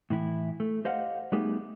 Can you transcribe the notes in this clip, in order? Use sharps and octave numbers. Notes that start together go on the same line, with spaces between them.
A2 E3 E4
A3
G4 C5 D#5 F5 F#5
G3 A3 B3 D#4 G4 G#4